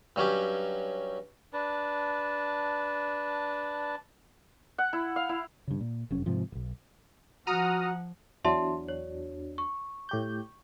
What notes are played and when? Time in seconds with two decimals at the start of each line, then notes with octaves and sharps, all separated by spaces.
0.16 G2 F#3 C#4 G4
1.53 D4 B4 A5
4.78 F#5
4.93 E4
5.16 F5
5.29 E4
5.67 G2 C#3
5.80 A#2
6.11 F1 F#2 C#4
6.26 G#2 C3 F3
6.52 E1 B1
7.47 F3 F#4 F#5 A#5 D#6 F6
8.45 E2 F#3 D4 E5 A5 C6
8.88 C#5
9.58 C#6
10.09 A2 G4 G6